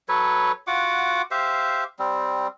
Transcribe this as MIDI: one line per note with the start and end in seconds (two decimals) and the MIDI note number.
0.09 0.52 54
0.09 0.52 69
0.09 0.52 71
0.09 0.52 73
0.67 1.22 65
0.67 1.22 66
0.67 1.22 78
0.67 1.22 86
1.31 1.84 67
1.31 1.84 72
1.31 1.84 76
1.31 1.84 77
1.99 2.47 55
1.99 2.47 60